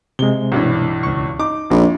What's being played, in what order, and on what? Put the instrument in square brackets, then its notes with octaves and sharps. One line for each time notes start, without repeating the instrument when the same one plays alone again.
[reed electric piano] C3 G#3 [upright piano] G7
[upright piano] B1 G2 E3
[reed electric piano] C#2 C#6
[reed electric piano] D#4 [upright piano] D6
[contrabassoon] A#1 [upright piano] F2